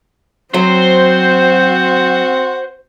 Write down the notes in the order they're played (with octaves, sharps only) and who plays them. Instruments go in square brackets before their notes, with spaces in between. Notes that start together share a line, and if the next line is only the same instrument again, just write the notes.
[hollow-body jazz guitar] F#3 [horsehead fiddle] C4 [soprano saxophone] F#4 [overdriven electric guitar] C5